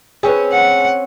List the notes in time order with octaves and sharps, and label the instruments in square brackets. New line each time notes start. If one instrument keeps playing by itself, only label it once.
[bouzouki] C4 C#4 C#5 [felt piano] G#4 B4
[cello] F#5